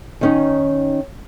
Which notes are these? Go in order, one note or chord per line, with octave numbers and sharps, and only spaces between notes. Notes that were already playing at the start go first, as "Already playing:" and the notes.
D#3 C#4 D#4